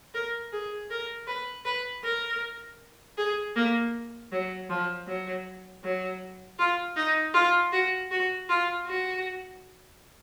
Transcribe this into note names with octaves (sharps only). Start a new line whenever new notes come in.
A#4
G#4
A#4
B4
B4
A#4
G#4
A#3
F#3
F3
F#3
F#3
F4
D#4
F4
F#4
F#4
F4
F#4